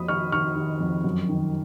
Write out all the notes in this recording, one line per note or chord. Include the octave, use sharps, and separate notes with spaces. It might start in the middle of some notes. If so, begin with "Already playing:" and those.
Already playing: F2 A#3 B5 D#6
D#3 C#6 F6
D#3 C#6 F6
D#3
F2
F#2
D#3